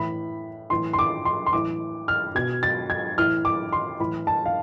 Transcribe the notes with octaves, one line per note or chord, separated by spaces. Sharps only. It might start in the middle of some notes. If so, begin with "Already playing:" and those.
Already playing: A2 E3 B5
A2 E3 C6
C6
D6
C6
C6
A2 E3 D6
F6
B2 G#6
A6
G#6
A2 E3 F6
D6
C6
A2 E3 B5
A5
F5